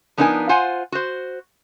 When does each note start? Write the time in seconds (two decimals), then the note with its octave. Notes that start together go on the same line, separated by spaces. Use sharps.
0.18 F3 B3 D4 D#4 A#4 G#5
0.49 F4 C5 F#5 G#5
0.92 F#4 C5